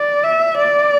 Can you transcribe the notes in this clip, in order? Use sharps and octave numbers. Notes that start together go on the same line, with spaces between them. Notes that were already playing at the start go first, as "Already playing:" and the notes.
Already playing: D5
E5
D5